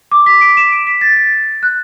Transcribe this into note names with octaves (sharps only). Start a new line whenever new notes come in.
D6
B6
D7
E7
D7
B6
A6
A6
F#6